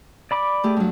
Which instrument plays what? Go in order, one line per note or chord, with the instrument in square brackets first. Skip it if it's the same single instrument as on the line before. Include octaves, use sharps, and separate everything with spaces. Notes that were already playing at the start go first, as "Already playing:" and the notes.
[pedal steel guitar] D5 B5 D6
[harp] A3 G4 G#4
G2 F#3